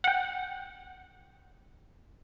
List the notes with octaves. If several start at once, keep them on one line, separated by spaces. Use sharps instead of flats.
F#5 G5